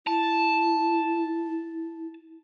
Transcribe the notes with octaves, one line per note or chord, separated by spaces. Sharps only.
E4 A5